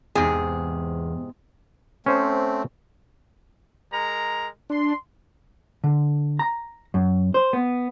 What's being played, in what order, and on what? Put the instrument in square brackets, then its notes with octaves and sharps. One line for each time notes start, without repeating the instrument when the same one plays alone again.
[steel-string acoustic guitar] E2 [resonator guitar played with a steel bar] G#2 C3 G#4
[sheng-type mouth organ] A3 C4 [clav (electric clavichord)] C#4 C5
[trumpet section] G#3 A#4 A#5
[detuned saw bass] D4 [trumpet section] C6
[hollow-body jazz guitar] D3
A#5
F#2
C5
B3